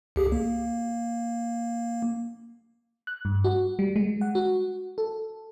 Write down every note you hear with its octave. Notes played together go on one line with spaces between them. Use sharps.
C#2 G4 G#4
A#3
F#6
G2
F#4
G3
G#3
F#5
F#4
A4